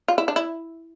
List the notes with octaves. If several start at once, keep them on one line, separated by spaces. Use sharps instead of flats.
F4
E4
D4
E4